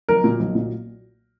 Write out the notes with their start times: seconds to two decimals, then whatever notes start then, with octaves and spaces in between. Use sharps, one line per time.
0.09 B1 A#4
0.24 A#2 F#3
0.40 B1
0.55 A#2 F#3